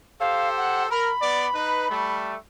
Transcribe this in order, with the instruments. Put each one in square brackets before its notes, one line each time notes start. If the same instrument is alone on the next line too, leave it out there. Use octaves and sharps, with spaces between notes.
[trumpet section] G4 A4 C5 [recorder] F5
[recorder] F#5
[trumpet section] A#4 [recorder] B5
[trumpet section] B3 D5
D#4 B4
G3 A3